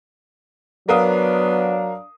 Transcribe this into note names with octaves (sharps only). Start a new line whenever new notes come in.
F#3 B3 D4 A#4 F5 D#6